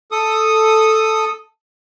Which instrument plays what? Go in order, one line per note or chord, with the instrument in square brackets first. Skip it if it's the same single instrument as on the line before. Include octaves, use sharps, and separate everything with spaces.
[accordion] A4 D#6